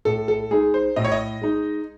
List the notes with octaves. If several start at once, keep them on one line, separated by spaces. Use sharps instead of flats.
A2 A4
A4
G#3 D#4 G#4
C5
A2 D#5
C#5
D#5
G#3 D#4